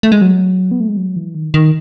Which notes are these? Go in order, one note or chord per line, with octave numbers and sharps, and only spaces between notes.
A3
G#3
F#3
B3
A3
G#3
F#3
E3
D#3
D#3